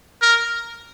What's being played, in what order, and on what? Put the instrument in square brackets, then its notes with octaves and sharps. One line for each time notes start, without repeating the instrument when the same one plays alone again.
[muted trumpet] A#4